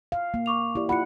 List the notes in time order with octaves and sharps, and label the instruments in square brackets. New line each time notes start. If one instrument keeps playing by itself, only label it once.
[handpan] F5
A#3
[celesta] C#6 D6 F7
[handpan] E4 G4 D5
[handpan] E4 F4 F#5 [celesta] B5 C#7